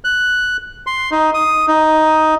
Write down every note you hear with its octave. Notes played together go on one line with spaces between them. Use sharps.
F#6
C6
D#4
D#6
D#4